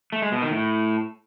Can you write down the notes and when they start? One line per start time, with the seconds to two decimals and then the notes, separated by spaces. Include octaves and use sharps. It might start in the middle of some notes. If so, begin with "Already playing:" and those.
0.12 A3
0.22 G#3
0.32 B2
0.42 D#3
0.51 A2